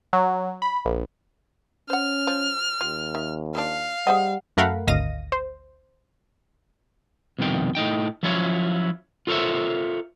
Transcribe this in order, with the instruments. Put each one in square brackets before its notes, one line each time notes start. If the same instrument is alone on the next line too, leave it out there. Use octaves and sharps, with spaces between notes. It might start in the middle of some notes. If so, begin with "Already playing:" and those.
[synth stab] F#3
B5
A#1
[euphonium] C#4 [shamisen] C5 F#5 [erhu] F6
[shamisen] F3
[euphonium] D#2 [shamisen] F4 G4
[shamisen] D#3 E5
[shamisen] F3 A#3 D4 [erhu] F5
[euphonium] G3 [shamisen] G#4 C5 D#5 [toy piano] F#5
[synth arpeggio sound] F#2 A3 A#4 F5 F#5 B5
G#1 D2 D#5 F5 A#6 D#7
C5
[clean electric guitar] C2 F2 B2 D#3 G5
A2 D#4 G5
F3 F#3 C#4 E4 F4 C#5
F4 A4 A#4 C5 C#5 E5